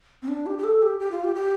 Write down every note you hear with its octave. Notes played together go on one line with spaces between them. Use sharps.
C4
D4
G4
G4
A4
G4
G4
F4
G4
G4